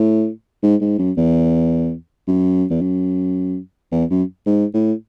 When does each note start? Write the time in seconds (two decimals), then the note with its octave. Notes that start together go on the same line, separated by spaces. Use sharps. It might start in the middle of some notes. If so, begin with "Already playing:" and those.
Already playing: A2
0.63 G#2
0.81 G#2
0.99 F#2
1.17 E2
2.27 F#2
2.70 E2
2.82 F#2
3.92 E2
4.10 F#2
4.46 G#2
4.74 A2